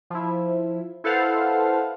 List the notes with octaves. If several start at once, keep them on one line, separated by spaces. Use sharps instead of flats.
F3 E4
E4 A4 B4 C5 F5 F#5